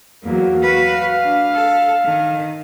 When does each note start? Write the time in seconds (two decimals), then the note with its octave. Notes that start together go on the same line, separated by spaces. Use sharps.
0.23 E2 F#3 A#3
0.62 F#4 B4 F5
1.24 D4
1.53 A4
2.05 D#3